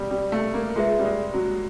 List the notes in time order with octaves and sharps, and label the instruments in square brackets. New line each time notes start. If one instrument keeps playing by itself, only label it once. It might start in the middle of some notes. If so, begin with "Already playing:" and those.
Already playing: [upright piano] B2 G3
G3
A3
A#3
[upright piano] G#3 [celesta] F4 G#4 B4 E5
[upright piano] G3
G#3
F#3